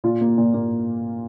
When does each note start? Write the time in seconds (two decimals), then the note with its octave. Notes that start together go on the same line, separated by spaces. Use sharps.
0.04 A#2 F4
0.21 A#3
0.38 A#2
0.54 A#3